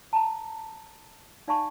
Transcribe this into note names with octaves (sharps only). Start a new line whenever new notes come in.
A5 A#5
D#4 D5 F5 G#5 A5 C#6